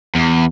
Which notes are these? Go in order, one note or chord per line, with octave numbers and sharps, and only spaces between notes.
E2